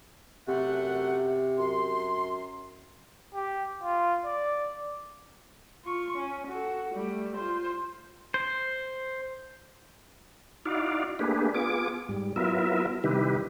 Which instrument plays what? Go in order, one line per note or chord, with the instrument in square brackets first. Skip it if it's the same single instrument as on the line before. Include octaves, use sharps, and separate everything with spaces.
[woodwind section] F#2 A3 F#5 [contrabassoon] C3
[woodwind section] F#2 C6
[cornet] G4
F4
D5
[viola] F4 C#6
C#4
F#4 A4
G3 A3
F4 C5
[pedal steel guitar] C5
[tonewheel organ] D#4 E4 F#4 D5 F5
A3 A#3 D4 G4 G#4 B4
B3 F4 G#4 D6
G#2 G3
F#3 B3 E4 F4 A#4 E5
C3 D#3 G3 E4 G4 B4